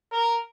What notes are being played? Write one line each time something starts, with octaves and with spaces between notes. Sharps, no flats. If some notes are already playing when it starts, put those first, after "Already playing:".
A#4